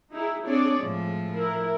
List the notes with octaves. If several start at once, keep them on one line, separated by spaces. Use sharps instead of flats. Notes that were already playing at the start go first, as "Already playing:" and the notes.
D#4 E4 G#4
C4 D4 G#4 C#5 D5
A2 F3 G#3
E4 A#4